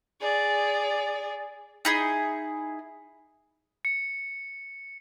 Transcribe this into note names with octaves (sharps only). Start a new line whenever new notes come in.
G#4 D5
D#4 E4 G#4
C#7